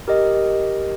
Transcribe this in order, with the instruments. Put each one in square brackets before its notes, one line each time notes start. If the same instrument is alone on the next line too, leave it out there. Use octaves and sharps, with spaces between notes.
[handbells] G4 A#4 D#5